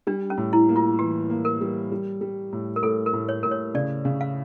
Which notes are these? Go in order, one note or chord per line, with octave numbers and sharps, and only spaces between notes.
G3 D4
C#4
A2
E4
A#3
F4
E3 G4
A#3
A#4
G3
G3
G3
A2
A#4
A2 A4
A#4
A2
C#5
A2 A#4
C#5
C#3 D5
C#3
F5